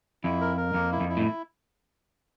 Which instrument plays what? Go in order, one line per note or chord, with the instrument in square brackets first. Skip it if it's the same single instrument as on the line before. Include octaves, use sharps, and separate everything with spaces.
[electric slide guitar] F2 [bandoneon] E4
[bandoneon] A#4
A#4
[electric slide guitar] F2 [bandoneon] A#3
[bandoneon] E4
[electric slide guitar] F2
[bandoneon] E4
[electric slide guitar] A2